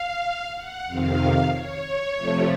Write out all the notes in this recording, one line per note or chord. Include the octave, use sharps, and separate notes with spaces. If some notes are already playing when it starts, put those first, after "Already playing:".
Already playing: F5
F#5
F2 C3 D#3 F5
C#5
C3 F3 A3